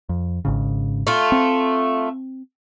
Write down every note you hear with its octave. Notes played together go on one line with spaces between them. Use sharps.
F2
G#1 G#2 C#3
A3 F4
C4